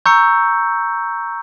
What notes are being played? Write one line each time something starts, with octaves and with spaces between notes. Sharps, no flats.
A#5 C#6 E6 G6 C#7